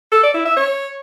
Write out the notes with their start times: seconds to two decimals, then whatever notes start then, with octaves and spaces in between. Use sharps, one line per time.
0.12 A4
0.23 D5
0.34 E4
0.46 E5
0.57 C#5